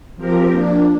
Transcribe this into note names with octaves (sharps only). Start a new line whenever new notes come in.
F3 C4 G4 A#4
F3 A#3 D4